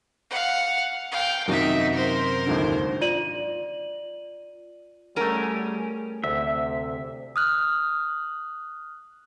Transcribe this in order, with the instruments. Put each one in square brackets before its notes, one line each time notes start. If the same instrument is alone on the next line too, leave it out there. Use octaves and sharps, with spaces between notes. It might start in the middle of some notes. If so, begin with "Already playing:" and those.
[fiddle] F5 F#5
F5 G5
[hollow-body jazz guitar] F#2 C3 [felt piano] D#3 F#4 [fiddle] D#4 E5
[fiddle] A#4 C5
[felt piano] G#1 D#2 D3
[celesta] F4 D5 D#7 F#7
[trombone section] G3 G#4 [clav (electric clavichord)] A3 F#5 [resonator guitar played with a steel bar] C#4 A#4
[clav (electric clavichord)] D2 [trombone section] C3 [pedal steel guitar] E5
[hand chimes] D#6 F6 F#6